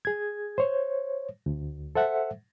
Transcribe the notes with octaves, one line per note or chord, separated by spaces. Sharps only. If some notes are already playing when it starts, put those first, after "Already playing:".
G#4 G#6
C5 C#5
D2
A4 C5 E5 F#5